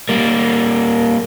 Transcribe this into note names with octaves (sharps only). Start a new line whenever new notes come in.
G3 A#3